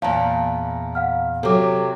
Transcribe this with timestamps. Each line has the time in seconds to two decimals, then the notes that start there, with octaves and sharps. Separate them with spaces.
0.02 E2 A#2 F5 A5 A#5
0.95 F5 F#5 F6
1.43 C3 F#3 A4 D6